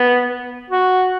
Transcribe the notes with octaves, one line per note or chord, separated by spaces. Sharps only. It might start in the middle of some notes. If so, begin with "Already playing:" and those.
Already playing: B3
F#4